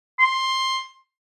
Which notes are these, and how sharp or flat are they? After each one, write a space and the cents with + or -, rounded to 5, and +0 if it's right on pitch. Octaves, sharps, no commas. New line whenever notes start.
C6 +10